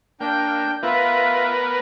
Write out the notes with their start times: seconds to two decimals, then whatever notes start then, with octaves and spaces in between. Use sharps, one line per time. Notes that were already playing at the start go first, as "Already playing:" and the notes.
0.20 A#3 D4 G5 G6
0.83 B3 F4 A#4 B4 E5